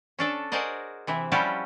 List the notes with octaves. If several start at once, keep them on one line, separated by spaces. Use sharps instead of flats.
C#4 D4 A4
F#4 G#4 A#4 C5 D5 D#5
C3 E3 E4
F3 G3 C#4 E4 F#4 G4